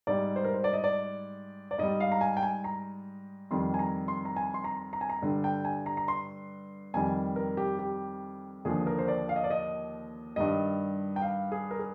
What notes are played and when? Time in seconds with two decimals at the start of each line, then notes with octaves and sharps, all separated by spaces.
0.07 G#2 G3 D5
0.36 C5
0.44 A#4
0.54 C5
0.64 D5
0.73 D#5
0.84 D5
1.71 D5
1.78 G#2 G3 D#5
2.00 F5
2.12 A#5
2.21 G#5
2.37 G5
2.43 G#5
2.64 A#5
3.51 F2 D#3 G3 C6
3.74 G#5
3.79 A#5
4.08 C6
4.25 A#5
4.36 G#5
4.54 C6
4.64 A#5
4.93 A#5
5.01 G#5
5.09 A#5
5.22 G2 D3 G3
5.44 G5
5.65 G#5
5.86 A#5
5.97 A#5
6.08 C6
6.94 F2 D#3 G3 G#5
7.36 A#4
7.57 G4
7.79 G4
8.65 D#2 D3 F3 G#4
8.87 A#4
8.98 C5
9.08 D5
9.29 F5
9.36 D#5
9.44 D5
9.50 D#5
10.36 G2 D#3 G3 D#5
11.16 G5
11.22 F5
11.52 G#4
11.71 A#4
11.79 G#4